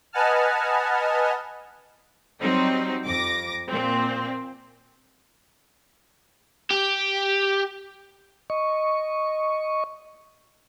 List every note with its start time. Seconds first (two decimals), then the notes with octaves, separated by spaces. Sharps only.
0.13 B4 D#5 F#5 G#5 A5 F6
2.41 F#3 G3 C4 D#4
3.05 F2 D6 A#6
3.70 A#2 C4
6.71 G4
8.50 D#5 C#6